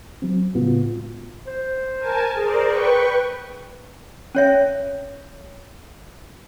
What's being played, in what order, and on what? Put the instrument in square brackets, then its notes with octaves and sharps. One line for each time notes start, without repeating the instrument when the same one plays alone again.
[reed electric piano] F#3 C4
A2 C#3 G#3 B3 F4 F#4
[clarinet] C5
[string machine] A#4 G#5 A5
[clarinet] G#4 [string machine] A#4 C5 D5
[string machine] B4 G5 C#6
[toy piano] C#4 C#5 E5